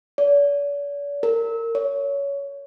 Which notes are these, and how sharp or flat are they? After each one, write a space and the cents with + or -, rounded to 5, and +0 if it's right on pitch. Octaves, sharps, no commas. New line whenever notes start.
D5 -45
A#4 -30
C#5 +20